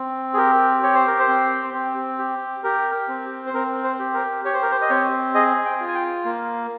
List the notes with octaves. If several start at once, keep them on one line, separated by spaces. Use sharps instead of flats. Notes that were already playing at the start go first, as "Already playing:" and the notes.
Already playing: C4
G#4
G4 A#4
G4 C#5
C5
A#4
C5
C4
C4
G4
G4 A#4
C4
C5
C4 A#4
C5
G4
A#4
G4 C#5
C5
A#4
C5
D#5
C4 C#5
G#4 D#5
G5
F4
G#5
G5
A#3